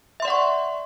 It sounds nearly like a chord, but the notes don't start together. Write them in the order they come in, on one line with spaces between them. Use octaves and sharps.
E5 C6 D5 F#5 C#6